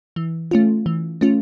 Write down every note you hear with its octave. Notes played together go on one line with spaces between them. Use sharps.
E3
A3 C#4 F4
E3
A3 C#4 F4